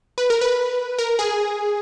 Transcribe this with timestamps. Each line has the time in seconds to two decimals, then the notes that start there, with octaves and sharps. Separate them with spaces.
0.18 B4
0.30 A#4
0.41 B4
0.98 A#4
1.19 G#4